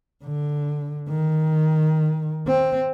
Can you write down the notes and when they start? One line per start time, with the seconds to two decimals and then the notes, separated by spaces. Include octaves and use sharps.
0.24 D3
1.09 D#3
2.48 C4